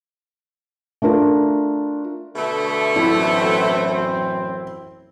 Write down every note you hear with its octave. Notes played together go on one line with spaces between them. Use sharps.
A3 D4 F4 A#4
B2 D3 A3
A1 F#2 C4 E4